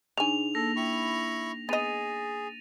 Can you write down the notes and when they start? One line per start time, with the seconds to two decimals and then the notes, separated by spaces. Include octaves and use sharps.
0.18 C#3 D4 D#4 G#4 G#5 F7
0.55 A#3 A4 A#6
0.76 E4 G5 B5 C#6
1.69 B3 G#4 D#5 A6 D#7 F7